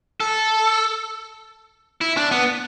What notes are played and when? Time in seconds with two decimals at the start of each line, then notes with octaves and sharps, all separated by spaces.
0.20 A4
2.01 E4
2.17 D4
2.31 B3